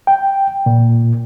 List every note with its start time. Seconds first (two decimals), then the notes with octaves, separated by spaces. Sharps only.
0.07 G5
0.66 A#2